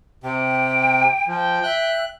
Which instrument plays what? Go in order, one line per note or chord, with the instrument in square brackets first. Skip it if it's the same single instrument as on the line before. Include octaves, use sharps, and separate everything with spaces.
[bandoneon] C3 [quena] G5
[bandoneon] F3 [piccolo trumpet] G5
[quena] E5 [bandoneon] F#6